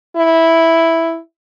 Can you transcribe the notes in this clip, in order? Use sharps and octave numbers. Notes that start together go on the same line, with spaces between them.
E4